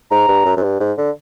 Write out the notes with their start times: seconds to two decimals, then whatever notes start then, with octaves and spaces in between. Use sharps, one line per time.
0.11 G#2 A#5
0.28 G2
0.46 F#2
0.57 F#2
0.63 G2
0.80 G#2
0.98 D3